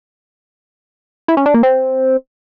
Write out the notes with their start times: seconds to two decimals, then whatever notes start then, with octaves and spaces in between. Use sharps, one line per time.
1.28 E4
1.37 C#4
1.46 D4
1.54 A#3
1.63 C4